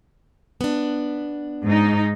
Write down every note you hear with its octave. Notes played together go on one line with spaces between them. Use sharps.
B3 D4
G#2 D#4